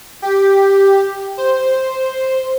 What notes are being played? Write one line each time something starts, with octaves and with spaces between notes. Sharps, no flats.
G4
C5